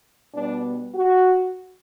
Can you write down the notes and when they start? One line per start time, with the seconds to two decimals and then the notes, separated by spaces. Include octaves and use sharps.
0.34 B2 G3 B3 D4
0.94 F#4